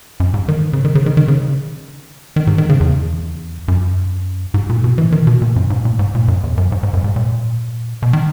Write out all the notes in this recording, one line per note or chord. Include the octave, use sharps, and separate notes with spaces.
F#2
G#2
D#3
C#3
D#3
C#3
D#3
D#3
C#3
D#3
G#2
D#3
C#3
E2
F#2
G#2
A#2
B2
E3
D#3
B2
A#2
F#2
G#2
A#2
G#2
A#2
F#2
E2
F#2
G#2
G#2
F#2
G#2
A#2
B2
D#3